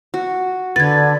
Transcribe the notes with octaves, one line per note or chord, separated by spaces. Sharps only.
F#4
D3 B4 G#6 A6